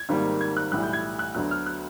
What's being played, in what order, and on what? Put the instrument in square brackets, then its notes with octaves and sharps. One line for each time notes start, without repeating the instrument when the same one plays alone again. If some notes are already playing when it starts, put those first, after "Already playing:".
Already playing: [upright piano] G#6
G#1 G#2 D#3 G3 A#3
G#6
F#6
B1 A2 E3 G3 F#6
G6
G#6
F#6
D2 D3 F#3 B3 F#6
F6
F#6